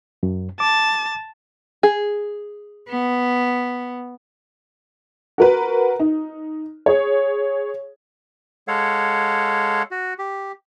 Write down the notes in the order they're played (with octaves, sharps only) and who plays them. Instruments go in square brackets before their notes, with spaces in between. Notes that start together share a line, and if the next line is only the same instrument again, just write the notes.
[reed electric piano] F#2
[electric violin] A5 [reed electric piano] D6
[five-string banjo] G#4
[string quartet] B3
[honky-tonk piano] F#4 A#4 B4
D#4
G#4 C#5
[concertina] G#3 A4 C#5 F5 F#5
F#4
G4